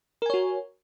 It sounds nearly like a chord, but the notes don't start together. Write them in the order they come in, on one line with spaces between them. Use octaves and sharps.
A#4 G#5 C#5 F#4